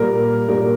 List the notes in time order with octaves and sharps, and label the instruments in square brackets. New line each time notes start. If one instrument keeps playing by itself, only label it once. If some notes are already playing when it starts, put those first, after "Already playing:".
Already playing: [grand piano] A#2 G3 A#4
A#2 G3 A#4